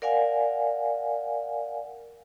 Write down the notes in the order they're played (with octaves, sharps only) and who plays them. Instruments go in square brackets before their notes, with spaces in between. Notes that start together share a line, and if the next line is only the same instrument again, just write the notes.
[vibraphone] A#4 D5 F5 F#5 G#5